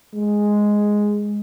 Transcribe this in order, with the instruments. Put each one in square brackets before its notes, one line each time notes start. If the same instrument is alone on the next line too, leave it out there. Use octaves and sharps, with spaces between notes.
[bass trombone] G#3